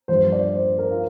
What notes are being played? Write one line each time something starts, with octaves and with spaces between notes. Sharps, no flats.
G2 F3 C5
D5
C5
A#4
F4